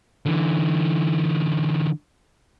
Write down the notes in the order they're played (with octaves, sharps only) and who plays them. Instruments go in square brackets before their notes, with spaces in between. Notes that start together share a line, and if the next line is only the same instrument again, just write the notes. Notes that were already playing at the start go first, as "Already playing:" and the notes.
[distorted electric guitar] D3 E3